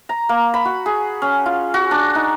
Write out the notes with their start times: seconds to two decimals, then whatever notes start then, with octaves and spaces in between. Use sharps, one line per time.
0.09 A#5
0.29 A#3
0.54 B5
0.65 F#4
0.86 G#4
1.22 C#4
1.46 F4
1.74 F#4
1.91 D4
2.15 D#4